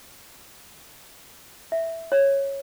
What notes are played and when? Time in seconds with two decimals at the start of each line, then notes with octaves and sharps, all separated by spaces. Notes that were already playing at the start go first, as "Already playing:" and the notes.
1.72 E5
2.12 C#5